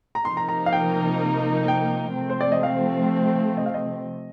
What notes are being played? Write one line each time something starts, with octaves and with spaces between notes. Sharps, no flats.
A#5
C3 F3 A#3 D#4 A#4 C6
A#5
A#5
F5
G5
G5
C3 F3 A3 C4
C5
D5
D#5
F5
D#5
F5
D#5